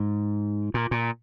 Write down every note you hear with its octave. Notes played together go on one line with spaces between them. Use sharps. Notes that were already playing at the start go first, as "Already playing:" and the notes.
Already playing: G#2
A#2
A#2